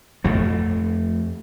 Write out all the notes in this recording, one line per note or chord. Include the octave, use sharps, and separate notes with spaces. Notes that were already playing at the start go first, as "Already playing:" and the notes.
F2 A3